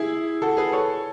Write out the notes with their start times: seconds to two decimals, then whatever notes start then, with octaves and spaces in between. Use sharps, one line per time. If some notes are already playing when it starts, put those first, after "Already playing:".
Already playing: E4 G#4
0.42 F#4 A4
0.57 G#4 B4
0.72 A4 C#5